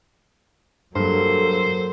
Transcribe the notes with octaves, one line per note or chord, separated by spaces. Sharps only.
G2 F#3 A#3 A4 C5